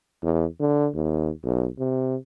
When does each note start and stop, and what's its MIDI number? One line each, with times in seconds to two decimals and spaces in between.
0.23 0.46 40
0.60 0.89 50
0.95 1.31 39
1.43 1.68 35
1.79 2.16 48